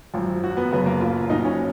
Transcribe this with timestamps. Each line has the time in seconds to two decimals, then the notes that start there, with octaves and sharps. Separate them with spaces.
0.14 G#1 F#2 F3
0.43 F#4
0.57 B3
0.72 F#1 F#2 C#3 B3
0.86 A#3
1.00 F4
1.29 B1 A#2 F3 D#4
1.44 C#4